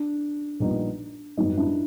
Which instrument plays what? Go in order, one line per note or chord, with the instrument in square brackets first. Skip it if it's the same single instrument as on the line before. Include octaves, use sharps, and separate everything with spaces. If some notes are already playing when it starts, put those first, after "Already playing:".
Already playing: [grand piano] D4
[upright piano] A#1 A#2 G3 B3 D#4
[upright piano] G#1 F#2 D#3 G3 B3 [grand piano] D#4
[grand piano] D4 E4